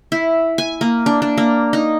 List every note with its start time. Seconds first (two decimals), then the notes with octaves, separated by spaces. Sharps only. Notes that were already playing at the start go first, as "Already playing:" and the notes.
0.12 E4
0.58 G#5
0.81 A#3
1.06 D4
1.22 D4
1.38 A#3
1.73 D#4